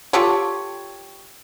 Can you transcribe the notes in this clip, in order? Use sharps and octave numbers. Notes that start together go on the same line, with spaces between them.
F4 G4 A4 C#5